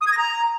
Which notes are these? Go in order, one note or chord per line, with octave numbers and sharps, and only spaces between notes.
D#6
G#6
A#6
A#5